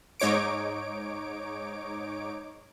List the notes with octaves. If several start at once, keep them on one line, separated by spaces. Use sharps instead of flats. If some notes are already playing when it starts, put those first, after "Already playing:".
G#2 D#4 C#5 D6 D7